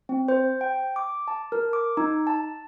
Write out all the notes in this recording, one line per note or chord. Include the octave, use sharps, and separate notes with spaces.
C4
C5
G5
D6
A5
A#4
D6
D#4
A5